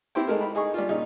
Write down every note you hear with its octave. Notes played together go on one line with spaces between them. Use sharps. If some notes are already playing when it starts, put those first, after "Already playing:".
C4 E4 G4 C5 G5
G#3 A3 D#4 A#4
B5
D#4 G#4 D#5 C#6
G3 D4 F4
A#2 C#3 D#4